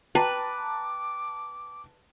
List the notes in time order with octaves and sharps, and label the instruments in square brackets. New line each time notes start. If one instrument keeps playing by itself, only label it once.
[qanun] B4 [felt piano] G5 A5 A#5 [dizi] D6